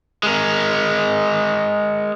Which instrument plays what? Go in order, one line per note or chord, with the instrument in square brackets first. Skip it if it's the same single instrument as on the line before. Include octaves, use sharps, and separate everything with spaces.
[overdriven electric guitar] G#3 A#4